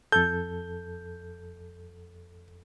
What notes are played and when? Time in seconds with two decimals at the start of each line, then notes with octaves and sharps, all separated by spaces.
0.12 F2 A4 G6